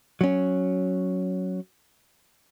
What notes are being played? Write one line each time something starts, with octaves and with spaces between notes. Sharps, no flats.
F#3 C#4